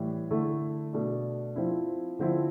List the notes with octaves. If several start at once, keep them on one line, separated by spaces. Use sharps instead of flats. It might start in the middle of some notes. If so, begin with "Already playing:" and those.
Already playing: A2 E3 G3
D3 A3 E4
B2 A3 D4
F3 C4 E4
D3 F3 C4 E4